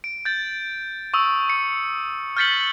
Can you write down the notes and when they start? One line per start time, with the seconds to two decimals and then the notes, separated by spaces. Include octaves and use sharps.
0.04 D7
0.25 G6 A6
1.14 C#6 D#6 E6
1.50 C#7
2.37 F6 G6 A6 B6 C#7 F#7